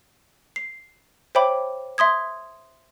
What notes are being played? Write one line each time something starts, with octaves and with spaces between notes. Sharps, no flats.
C7
C5 C#5 E5 G5 B5 D6
E5 C6 D#6 G#6